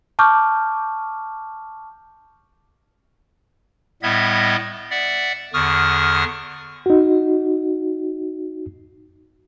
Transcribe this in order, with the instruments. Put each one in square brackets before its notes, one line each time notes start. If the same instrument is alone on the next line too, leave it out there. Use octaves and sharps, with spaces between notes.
[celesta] A5 C#6 D6 F6 G6
[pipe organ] A2 G3 B3 D#5 E5 G#6
D5 E5 F#5
E2 D3 C#6 D#6 F6
[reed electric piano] D#4 F#4